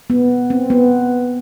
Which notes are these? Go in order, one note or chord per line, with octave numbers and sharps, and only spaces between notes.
B3
C4
B3